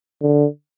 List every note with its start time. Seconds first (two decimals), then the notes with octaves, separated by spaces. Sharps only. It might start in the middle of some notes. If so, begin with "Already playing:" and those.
0.22 D3